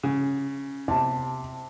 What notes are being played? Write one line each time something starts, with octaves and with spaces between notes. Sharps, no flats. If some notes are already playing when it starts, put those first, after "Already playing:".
C#3
C3 A5